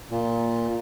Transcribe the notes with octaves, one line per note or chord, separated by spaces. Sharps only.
A#2